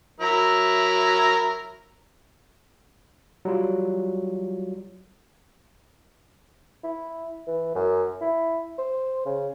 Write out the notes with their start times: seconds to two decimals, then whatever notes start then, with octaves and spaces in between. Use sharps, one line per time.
0.20 F#3 E4 A#4
3.45 F#3 G3 F4
6.84 E4
7.47 E3
7.75 F#2
8.21 E4
8.78 C5
9.26 C#3